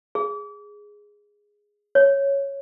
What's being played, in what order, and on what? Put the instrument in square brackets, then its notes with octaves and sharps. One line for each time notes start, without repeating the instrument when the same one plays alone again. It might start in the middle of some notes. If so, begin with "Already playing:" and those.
[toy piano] G#4
C#5